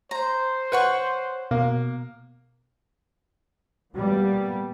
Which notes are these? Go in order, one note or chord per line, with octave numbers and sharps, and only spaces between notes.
C5 A#5
B4 C#5 F#5 C#6
B2 A#3
A#2 G3 B3